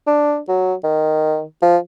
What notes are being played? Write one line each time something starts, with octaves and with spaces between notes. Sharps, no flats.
D4
F#3
D#3
F3